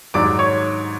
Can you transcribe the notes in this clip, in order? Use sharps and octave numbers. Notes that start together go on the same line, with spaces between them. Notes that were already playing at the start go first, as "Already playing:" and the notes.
G#2 D#3 F#3 D5 D6
C#5 C#6